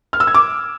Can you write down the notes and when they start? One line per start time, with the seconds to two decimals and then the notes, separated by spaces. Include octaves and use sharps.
0.13 F6
0.20 E6
0.27 G#6
0.34 D6